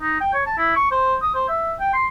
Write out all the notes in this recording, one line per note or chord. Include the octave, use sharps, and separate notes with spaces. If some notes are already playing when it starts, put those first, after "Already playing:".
D#4
G5
C#5
A5
E4
C#6
C5
D#6
C5
E5
G5
C6